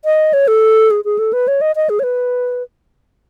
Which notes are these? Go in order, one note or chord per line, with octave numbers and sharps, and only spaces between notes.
D#5
C#5
A4
G#4
G#4
A4
B4
C#5
D#5
D#5
G#4
C#5
B4